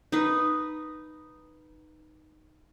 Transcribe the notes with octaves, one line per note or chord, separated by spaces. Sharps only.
D#4 B4